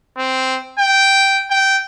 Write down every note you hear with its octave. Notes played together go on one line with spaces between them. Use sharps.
C4
G5
G5